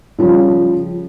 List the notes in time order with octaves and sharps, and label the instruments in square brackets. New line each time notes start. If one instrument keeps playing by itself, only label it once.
[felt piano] C#3 F3 G3